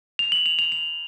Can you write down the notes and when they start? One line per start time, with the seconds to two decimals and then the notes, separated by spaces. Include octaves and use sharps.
0.19 F7
0.32 F#7
0.46 F7
0.59 F7
0.72 F7